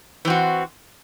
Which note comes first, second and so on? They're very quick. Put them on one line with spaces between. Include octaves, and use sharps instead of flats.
E3 C4 F#4